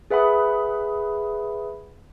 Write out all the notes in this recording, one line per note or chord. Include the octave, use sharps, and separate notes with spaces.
G#4 B4 E5 F#5 B5 D#6